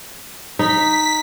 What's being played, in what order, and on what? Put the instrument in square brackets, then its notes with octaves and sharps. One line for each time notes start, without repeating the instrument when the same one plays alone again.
[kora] D#4 [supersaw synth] B6